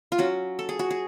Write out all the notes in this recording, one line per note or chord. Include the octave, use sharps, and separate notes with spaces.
F4
F#3 C#4 F#4
A4
G#4
F#4
G#4